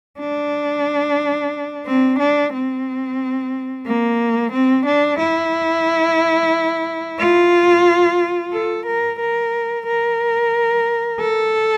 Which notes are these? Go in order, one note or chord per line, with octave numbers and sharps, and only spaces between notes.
D4
C4
D4
C4
A#3
C4
D4
E4
F4
A4
A#4
A#4
A#4
A4